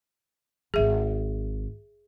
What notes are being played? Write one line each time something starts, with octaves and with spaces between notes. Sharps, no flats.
D#1 G#1 G#4 E5